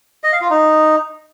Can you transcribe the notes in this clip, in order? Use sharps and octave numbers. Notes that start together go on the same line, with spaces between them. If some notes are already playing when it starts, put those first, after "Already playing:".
D#5
F5
F4
D#4